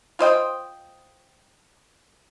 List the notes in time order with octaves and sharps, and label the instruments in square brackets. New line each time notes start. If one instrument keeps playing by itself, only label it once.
[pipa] F4 C5 D#5 G5